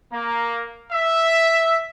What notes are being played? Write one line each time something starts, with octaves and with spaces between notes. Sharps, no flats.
A#3
E5